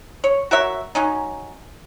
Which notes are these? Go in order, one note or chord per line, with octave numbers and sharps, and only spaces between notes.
C#5
F#4 A#4 C#5 E5
F#3 C#4 D#4